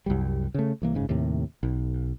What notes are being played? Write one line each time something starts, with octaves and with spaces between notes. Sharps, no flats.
C2 F#2 G3
C#3 A3
C2 E3 A#3
F#1 G#2 C#3
D#2 A2 C3
B1